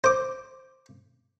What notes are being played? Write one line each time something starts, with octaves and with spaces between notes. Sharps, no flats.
C5 D6